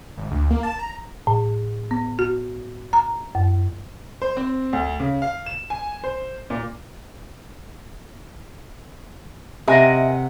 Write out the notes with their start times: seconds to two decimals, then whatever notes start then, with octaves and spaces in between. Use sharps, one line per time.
0.18 G#1
0.31 D2
0.51 A#3
0.63 A5
0.79 A#5
1.27 A2
1.91 B3
2.19 F#4
2.93 A#5
3.35 F#2
4.22 C5
4.37 C4
4.73 D2
5.00 C#3
5.22 F5
5.46 E7
5.70 G#5
6.04 C5
6.50 A#2
9.68 C3 A#4 D#5 F#5 G#5